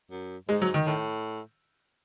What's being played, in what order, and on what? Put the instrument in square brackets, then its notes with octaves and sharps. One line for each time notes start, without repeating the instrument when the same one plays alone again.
[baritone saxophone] F#2
[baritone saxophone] G#2 [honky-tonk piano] G#3
[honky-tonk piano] F#3
D#3
[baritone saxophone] A2